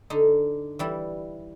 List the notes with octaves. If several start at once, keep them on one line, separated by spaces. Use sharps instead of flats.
D3 D#4
E3 G3 E4